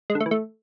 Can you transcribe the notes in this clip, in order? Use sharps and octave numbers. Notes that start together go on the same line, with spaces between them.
G#3
D3
A3
E3
A3